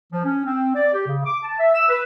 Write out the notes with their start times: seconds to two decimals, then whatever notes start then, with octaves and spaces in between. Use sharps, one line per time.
0.12 F3
0.24 C#4
0.45 C4
0.75 D5
0.93 G4
1.07 C#3
1.25 D6
1.43 A5
1.59 E5
1.75 E6
1.89 B4